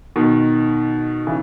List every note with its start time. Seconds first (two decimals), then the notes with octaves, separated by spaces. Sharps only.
0.16 B2 D#3
1.26 C#3 E3